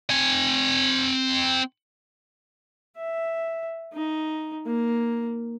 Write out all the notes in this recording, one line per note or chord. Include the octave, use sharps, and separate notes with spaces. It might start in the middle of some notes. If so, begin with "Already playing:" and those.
C4 G#5
E5
D#4
A#3